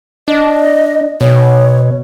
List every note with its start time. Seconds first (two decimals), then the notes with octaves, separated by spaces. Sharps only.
0.28 D4 D#5
1.21 B2 C#5